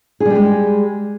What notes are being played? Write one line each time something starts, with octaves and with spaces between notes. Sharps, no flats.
G3 G#3 G4 G#4